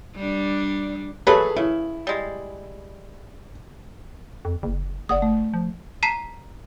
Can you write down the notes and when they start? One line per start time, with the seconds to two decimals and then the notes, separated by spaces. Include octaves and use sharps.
0.16 G3 D4
1.27 F#3 A3 G#4 A4 B4 B5
1.56 C#3 E4
2.07 G3 G#3
4.45 F2
4.63 F#1
5.09 F#1 D5 F#5 D#6
5.22 A3
5.54 F3
6.03 A5 A#5 B6 C7 D#7 E7